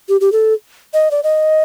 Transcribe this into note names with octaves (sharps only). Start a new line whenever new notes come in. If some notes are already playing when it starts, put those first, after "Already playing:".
G4
G4
A4
D#5
D5
D#5